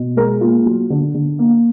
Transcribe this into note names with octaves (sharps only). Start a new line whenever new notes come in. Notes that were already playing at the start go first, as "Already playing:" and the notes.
Already playing: B2
G#3 A#4
A#3 F4
F#3
D3
D3
A#3